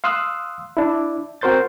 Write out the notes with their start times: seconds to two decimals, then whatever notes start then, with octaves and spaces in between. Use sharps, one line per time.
0.04 F5 C6 D#6 E6 F#6
0.77 D4 E4
1.41 C4 F#4 A#4 C5 G6 A6